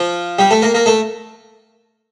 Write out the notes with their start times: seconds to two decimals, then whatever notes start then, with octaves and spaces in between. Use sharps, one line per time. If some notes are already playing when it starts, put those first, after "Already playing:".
Already playing: F3 F4
0.39 G3 G4
0.51 A3 A4
0.62 A#3 A#4
0.74 A#3 A#4
0.86 A3 A4